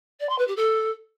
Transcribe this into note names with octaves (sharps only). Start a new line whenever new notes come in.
D5
C6
B4
G4
A4